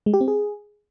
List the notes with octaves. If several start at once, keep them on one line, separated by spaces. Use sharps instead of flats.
G#3
G4
C4
G#4